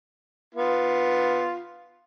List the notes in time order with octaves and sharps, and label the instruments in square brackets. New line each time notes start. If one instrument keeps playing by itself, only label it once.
[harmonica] B3 F4